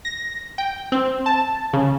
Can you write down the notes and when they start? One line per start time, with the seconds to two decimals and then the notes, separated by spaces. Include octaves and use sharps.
0.05 A#6
0.58 G5
0.92 C4
1.26 A5
1.73 C#3